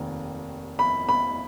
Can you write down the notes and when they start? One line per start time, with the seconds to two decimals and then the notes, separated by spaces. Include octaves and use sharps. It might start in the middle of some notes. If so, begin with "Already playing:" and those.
Already playing: F1 D#2 D#3
0.79 B5
1.09 B5